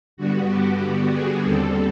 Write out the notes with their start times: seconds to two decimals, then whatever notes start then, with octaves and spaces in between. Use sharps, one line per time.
0.17 G2 D3 G3 B3 F#4
0.48 G4
0.80 G4
1.11 G#4
1.43 D#2 D3 G3 C4 A4